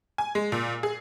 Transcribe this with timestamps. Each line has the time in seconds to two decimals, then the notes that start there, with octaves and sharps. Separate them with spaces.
0.18 G#5
0.35 G#3
0.52 A#2
0.83 G#4